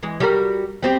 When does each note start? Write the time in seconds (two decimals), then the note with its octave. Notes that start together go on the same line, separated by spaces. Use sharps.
0.03 E3 G#3
0.20 G3 F#4 A#4
0.83 G3 C4 G4